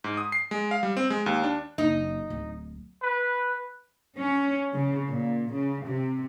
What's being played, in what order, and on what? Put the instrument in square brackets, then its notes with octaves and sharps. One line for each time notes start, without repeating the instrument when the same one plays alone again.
[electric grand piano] G#2
D#6
C7
G#3
F5
G3
C4
G#3
D#2
D4
[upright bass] F#1 [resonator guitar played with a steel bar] D#4
[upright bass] D1
[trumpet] B4
[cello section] C#4
C#3
A#2
C#3
C3